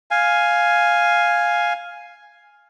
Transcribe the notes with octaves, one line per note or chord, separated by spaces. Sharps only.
F5 G#5